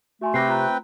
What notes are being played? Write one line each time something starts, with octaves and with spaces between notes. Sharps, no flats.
A3 F#4 G#5 C6
C3 C4 B4 G5 D6 A#6 C7
F4 A#5 F#6